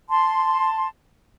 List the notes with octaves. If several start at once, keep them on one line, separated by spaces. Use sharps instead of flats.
A5 C6